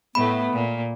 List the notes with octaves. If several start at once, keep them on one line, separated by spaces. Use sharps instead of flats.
A2 A3 B3 B5
A#2